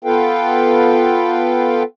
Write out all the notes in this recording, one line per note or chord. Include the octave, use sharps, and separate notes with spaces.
B3 F4 A4 B4 F5 G5